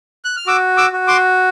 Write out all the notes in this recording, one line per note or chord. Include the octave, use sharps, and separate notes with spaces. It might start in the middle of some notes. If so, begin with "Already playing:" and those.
F#6
F6
F#4 D6 E6
D6 E6
F#4
C6 D6